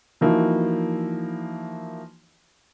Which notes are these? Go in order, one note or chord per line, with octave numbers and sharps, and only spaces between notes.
E3 F3 A#3 D#4 E4 F#4